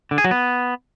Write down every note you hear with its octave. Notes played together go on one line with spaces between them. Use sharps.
D3
G#4
F#3
B3